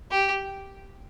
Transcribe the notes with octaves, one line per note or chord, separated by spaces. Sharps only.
G4